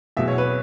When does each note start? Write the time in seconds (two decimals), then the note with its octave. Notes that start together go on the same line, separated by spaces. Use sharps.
0.17 E2 B2 F#3 E5
0.28 C#5
0.38 B4